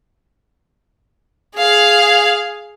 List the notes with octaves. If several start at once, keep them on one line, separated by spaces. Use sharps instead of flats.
G#4 F5